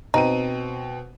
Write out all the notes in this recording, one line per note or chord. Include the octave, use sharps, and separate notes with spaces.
B2 C4 D#4 D#7